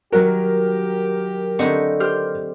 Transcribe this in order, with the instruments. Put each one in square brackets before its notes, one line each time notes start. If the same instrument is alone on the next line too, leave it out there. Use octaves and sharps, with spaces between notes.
[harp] D#3 F#3 F#4 [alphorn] G4 [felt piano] A#4
[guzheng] D3 D#4 E4 [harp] C4 D#5 C#6
[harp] G4 C5 F6